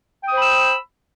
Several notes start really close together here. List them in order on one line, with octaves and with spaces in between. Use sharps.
G5 D#6 C5 B5 E6